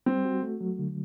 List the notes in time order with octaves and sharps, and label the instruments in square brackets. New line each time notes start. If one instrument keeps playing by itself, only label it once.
[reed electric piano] G3 [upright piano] C4
[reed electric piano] F#4
A3
F#3
D3